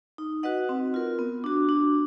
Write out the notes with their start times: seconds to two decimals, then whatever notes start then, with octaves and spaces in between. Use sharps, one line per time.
0.18 D#4
0.43 F#4 B4 D#5 F#5
0.69 C4
0.94 F4 A#4
1.19 B3
1.44 D4 F#4
1.69 D4